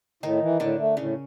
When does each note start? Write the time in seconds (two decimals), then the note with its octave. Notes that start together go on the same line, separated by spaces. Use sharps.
0.23 A2 D#3 D#4
0.41 E3
0.59 A2 D3 D4
0.78 A3
0.97 A2 C#3 C#4